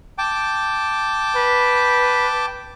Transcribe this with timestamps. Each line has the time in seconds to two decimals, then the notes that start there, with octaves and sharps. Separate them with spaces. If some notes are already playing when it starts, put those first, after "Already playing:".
0.18 G5 A5 D6
1.36 B4